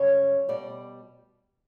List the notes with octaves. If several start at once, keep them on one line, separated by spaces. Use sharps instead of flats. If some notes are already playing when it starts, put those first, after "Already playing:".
Already playing: F#2 C#3 G3 C#5
B2 G3 D5